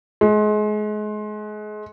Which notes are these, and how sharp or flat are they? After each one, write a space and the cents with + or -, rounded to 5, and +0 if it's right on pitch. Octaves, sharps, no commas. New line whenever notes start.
G#3 +30